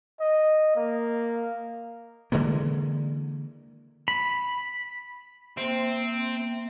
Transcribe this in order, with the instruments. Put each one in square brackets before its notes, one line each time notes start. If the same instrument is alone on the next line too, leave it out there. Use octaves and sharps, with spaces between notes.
[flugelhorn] D#5
A#3
[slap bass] D3 E3 G#3 A#3
[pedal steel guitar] B5
[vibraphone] A#3 E5 [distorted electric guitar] C4